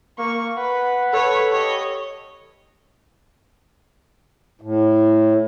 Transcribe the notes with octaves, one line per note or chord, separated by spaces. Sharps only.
A#3 C#6
B4 F#5
A4 B4 C#5
G4 C#5 D#5
A2